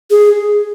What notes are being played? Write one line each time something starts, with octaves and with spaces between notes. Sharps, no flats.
G#4